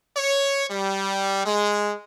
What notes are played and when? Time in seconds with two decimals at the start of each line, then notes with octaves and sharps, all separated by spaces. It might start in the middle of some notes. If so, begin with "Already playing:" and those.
0.16 C#5
0.70 G3
1.44 G#3